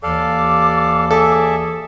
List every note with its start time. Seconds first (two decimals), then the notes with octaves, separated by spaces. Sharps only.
0.03 D#2 E3 A4 D5 F5 D6
1.11 G#4 A4 D5 E5